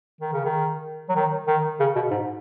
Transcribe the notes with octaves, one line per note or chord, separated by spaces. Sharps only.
D#3
C#3
D#3
F#3
D#3
D#3
C#3
B2
G#2